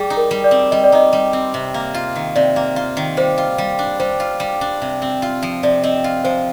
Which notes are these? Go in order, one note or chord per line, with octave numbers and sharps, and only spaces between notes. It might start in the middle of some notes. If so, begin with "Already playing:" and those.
Already playing: G3 G#4
D#4
A#4
G3
D5
C4
G3 D#5
D5
D#4 D#5
G3
C4
C3
A#3
F4
D#3
C3 D5
A#3
F4
D#3
G3 C5
F4
G3
D4
G3 C5
F4
G3
D4
C3
C4
F4
F3
C3 D5
C4 D#5
F4
F3 C5